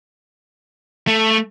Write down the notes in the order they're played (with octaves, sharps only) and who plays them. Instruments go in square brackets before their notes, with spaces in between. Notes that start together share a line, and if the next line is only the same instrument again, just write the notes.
[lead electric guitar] A3